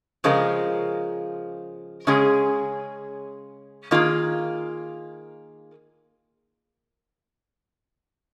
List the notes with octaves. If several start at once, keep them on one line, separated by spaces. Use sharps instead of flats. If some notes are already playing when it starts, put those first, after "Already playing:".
C#3 F3 G#3 F4 A#4
C#3 G#3 C#4 G#4
D#3 A#3 F4 G#4